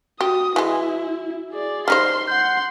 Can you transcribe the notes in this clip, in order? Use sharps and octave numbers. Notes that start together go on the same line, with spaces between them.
F#4 G4 D#6
E3 G#3 E4
G#4 D5
G3 D#4 C5 C6 F6
F#5 C6 G6